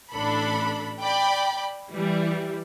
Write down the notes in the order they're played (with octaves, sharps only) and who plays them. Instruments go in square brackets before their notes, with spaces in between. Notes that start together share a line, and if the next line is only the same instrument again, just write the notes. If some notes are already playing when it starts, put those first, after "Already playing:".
[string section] A1 D4 A4 B5
D5 G5 B5
E3 G3